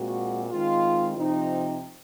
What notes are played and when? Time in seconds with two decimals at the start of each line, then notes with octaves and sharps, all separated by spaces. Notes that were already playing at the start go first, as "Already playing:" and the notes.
Already playing: A#2 G#3 C4 F#4
0.50 D#3 G#3 C4 F4
1.16 C3 F3 C4 D#4